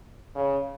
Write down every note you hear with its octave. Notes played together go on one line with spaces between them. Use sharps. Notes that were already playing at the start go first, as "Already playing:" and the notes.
C#3